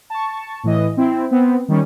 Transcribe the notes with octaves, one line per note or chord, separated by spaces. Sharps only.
A5 C#6
A2 E3 D#5
C4 E4
B3 C4
D#3 G3 C#4